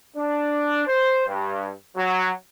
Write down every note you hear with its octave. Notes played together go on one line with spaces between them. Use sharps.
D4
C5
G2
F#3